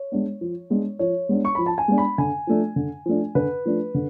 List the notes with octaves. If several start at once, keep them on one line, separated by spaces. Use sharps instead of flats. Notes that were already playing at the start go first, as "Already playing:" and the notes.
Already playing: C#5
G#3 B3 D4
F3
G#3 B3 D4
F3 C#5
G#3 B3 D4
C#6
F3 B5
A5
G#5
G#3 B3 D4
B5
D3 G#5
F3 A3 D4
D3
F3 A3 D4
D3 B4
F3 A3 D4
D3